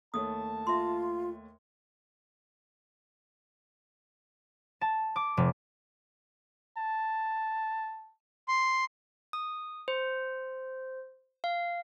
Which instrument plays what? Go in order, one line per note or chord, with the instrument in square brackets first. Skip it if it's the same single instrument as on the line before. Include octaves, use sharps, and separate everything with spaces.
[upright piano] D#2 A3 C#5 [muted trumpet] A5 [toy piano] D#6
[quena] F4 [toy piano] E5 C6
[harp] A5
D6
F1
[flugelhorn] A5
[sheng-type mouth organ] C6
[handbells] D#6
C5
F5